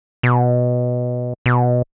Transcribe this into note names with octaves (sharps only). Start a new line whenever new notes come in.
B2
B2